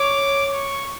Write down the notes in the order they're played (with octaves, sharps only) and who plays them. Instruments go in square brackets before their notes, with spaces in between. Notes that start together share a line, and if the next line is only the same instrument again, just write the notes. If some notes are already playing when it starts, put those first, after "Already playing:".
Already playing: [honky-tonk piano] C#5 [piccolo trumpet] D6
[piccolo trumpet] C#6